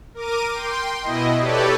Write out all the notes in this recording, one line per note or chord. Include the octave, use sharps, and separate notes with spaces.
A#4 D6 D#7
G5 C6
B2 E4 D#5
G4 A4 B4 C#5 D5